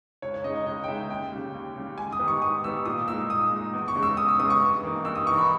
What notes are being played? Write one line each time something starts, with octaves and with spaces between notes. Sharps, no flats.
C#2 C#5
C#5
C#3 G#3 D#4 D#5
D#5
C#2 D#5
G5
C#3 G#3 D#4 E5
D#2 G5
C#3 G3
D#2
C#3 G3
G#2 G#5
D#6
D#3 G3 B3
C#6
G#2 D#6
D#3 G3 B3 E6
A#2 D#6
G#3 D#4 E6
A#2 D#6
G#3 D#4
E2
C#6
C#3 G#3 B3
E6
E2 D#6
E6
C#3 G#3 B3 D#6
C#6
G2
E3 A#3 D#4
G2 E6
D#6
E3 A#3 D#4 C#6
B5